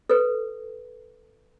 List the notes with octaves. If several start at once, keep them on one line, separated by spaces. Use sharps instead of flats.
A4 B4